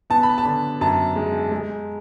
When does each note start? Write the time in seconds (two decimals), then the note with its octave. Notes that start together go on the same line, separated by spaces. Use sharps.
0.10 B3 A5
0.23 B5
0.38 A5
0.45 D3
0.81 F#2 A5
1.16 G#3
1.51 G#3